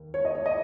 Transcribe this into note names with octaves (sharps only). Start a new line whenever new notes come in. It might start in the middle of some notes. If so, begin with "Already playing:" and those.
Already playing: D#2
C#5
D#5
C#5
D#5